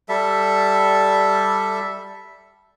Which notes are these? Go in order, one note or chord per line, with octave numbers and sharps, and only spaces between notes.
G3 A4 E5